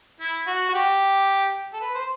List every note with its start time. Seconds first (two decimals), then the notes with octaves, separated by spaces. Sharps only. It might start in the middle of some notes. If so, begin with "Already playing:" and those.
0.20 E4
0.47 F#4
0.69 F#4
0.74 G4
1.73 A4
1.81 B4
1.95 C5